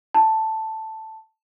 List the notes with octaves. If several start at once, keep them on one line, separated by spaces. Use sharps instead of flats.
A5